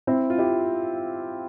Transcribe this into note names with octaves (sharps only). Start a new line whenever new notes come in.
C4 E4
F4
E4 G4